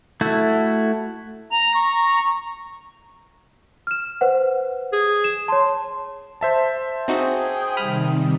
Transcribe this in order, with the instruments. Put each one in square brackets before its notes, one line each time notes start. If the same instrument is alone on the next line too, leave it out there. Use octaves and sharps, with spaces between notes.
[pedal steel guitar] A3 E4 F#4
[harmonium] A#5 [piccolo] F7
[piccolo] C#6
[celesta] F6 E7
B4 C5 F#5
[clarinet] G#4
[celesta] E7
[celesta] C#5 A5 [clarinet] C6
[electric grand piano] C5 E5 A5
[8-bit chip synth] C4 D#4 F#4 [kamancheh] G#4 G5
[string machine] C3 D#3 G3 [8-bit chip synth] B5 D#6 F6